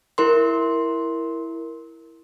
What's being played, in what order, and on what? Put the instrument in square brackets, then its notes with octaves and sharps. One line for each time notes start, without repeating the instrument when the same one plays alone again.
[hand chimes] E4 A#4 C6